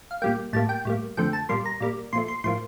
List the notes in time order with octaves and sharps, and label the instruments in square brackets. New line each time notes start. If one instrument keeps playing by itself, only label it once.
[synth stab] F5
A#2 G3 A#3 G5
A2 G3 A#3 A5
G5
A2 G3 A#3
F2 D3 F3 A3 G5
A5
A#2 G3 A#3 C6
A#5
A#2 G3 A#3
A#2 F3 A3 C6
C6
A2 F3 A#3 C6